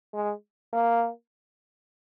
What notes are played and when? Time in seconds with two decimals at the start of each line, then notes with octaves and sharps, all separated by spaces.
0.13 G#3
0.73 A#3